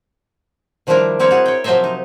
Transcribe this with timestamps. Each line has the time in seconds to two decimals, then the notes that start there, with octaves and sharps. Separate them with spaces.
0.87 D#3 F3 G3 D4 E4 A#4
1.19 G3 C4 E4 A#4 C#5
1.31 F#4 G#4
1.46 C#5 G5
1.64 C3 F3 F#3 C5 D#5 E5
1.84 D#4